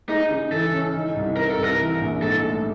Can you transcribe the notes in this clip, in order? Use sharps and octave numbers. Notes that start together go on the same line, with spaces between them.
G#3 D#4
C#3
E3 A4
C#4
D#3
C2
C3 A#4
A4
C2 A#4
E3
A#1
G#2 A4
A3